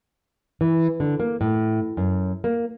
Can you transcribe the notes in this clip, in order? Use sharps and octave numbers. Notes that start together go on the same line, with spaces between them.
E3
D3
A#3
A2
F#2
A#3